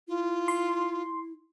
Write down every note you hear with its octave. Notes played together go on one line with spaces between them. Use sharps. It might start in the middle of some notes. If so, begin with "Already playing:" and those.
E4 F4
C6